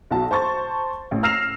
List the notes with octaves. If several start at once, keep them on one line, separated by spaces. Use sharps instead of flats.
B1 F#4 A5
C5 A5 C#6 A6
A1
E6 F6 A#6 C7 E7 F7